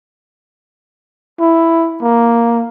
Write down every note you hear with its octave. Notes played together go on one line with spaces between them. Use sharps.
E4
A#3